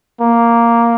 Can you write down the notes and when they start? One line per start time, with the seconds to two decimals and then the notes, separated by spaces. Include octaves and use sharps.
0.21 A#3